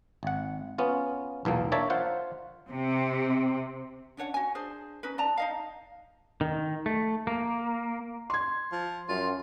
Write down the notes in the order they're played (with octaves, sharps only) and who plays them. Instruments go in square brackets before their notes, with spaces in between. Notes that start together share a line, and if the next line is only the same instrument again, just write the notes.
[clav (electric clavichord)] G#1 F#5
B3 C#4 F4
B1 E2 A#2 A#3
A#3 D4 C#5 E5 A5
F4 C5 F#5
[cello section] C3
[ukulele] C#4 D4 C#5 F#5
F#4 G#5
D4 G#4 C5
C#4 D#4 B4
D5 A5 A#5
D#4 D#5 F5
[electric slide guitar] D#3
A3
A#3
[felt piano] C6 G#6
[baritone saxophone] F3
[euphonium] F#2 [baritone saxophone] F4